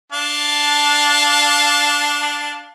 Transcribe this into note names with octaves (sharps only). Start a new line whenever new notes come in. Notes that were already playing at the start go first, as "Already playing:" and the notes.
D4 F5 A5